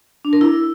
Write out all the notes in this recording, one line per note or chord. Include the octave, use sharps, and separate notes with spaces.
D4
A#4
E4